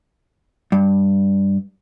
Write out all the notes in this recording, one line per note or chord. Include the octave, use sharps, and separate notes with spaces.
G2